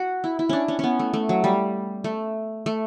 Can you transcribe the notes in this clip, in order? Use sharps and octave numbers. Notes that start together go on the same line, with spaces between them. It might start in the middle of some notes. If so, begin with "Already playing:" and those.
Already playing: F#4
E4
E4
C#4 D4
C#4
B3 C#4
A3
A3
F#3
G3
A3
A3